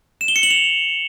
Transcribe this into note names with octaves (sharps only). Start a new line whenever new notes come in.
E7
G7
C#7
F#7
F7